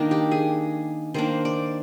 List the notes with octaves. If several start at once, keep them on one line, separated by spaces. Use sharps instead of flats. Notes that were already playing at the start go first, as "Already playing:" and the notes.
Already playing: D#3 A#3 D4 D#4
G4
G#4
D#3 A#3 D4 C5
D5